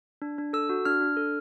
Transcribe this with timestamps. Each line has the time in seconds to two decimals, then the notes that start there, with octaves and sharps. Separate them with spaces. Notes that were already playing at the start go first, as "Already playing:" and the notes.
0.22 D4
0.38 D4
0.53 A4 E6
0.69 F#4
0.85 D4 F6
1.01 D4
1.17 A4